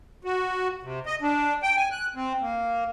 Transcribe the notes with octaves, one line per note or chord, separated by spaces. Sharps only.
F#4
C3
D#5
D4
G5
G#5
F#6
C4
A#3